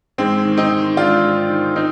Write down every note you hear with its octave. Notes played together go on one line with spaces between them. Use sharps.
G#2 G#3 C4
D#3
C4 D#4
D#3
G#2 D4 F4
G#2
D#3
C4 D#4